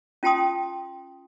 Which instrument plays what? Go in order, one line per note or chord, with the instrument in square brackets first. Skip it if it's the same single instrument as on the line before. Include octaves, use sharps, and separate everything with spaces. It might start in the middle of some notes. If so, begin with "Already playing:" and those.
[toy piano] C#4 F4 G5 A5 C6 D#6